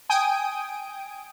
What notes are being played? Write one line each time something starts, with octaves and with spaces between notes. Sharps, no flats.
G5 G#5 D#6 D7